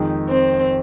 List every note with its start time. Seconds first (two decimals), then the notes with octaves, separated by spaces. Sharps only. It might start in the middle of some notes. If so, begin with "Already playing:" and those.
Already playing: F2 D#3 G#3 D#4
0.29 C4